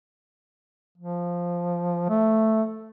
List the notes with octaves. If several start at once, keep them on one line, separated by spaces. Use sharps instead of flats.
F3
A3